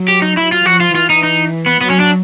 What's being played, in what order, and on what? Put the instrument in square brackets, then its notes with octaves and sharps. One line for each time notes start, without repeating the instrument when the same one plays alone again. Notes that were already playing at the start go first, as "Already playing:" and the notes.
Already playing: [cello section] F#3
[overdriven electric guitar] G4
D#4
[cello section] F#3 [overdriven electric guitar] E4
[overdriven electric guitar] F4
[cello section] F3 [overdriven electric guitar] F#4
[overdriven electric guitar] F4
[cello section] E3 [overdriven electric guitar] F4
[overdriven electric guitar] D#4
D#4
B3
[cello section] F#3 [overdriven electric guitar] B3
[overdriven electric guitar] C#4
D4